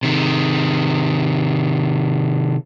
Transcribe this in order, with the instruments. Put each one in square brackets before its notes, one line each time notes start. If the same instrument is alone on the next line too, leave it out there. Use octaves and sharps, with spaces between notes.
[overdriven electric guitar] C3 D#3